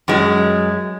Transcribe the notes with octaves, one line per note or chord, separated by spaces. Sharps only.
F#2 G#3